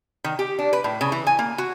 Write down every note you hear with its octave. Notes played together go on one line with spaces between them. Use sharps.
D#3
G4
D4
B4
A2
C#3
E3
G#5
A#3
F#4